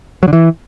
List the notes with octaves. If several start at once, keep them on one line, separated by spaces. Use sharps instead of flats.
F#3
D3
E3